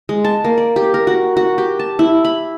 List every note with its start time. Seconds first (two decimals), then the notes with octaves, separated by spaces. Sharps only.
0.09 G#3
0.24 A5
0.44 A#3
0.58 D5
0.76 G4
0.94 A#4
1.07 F#4
1.37 F#4
1.58 G4
1.79 A5
1.99 E4
2.25 B5